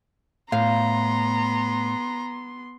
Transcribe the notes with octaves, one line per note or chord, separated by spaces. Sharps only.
A2 B3 F5 A#5 C6